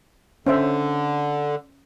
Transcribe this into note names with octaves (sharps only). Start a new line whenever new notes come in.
D3 C#4 C5 E5